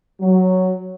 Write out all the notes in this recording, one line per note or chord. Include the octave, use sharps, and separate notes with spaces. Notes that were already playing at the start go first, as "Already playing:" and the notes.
F#3